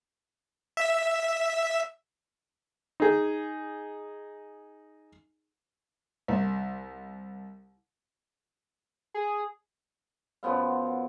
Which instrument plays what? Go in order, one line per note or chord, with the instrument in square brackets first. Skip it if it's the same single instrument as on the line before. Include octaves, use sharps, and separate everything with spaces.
[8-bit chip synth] E5
[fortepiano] D#4 G#4
C2
[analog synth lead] G#4
[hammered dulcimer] F#2 F3 B3 F5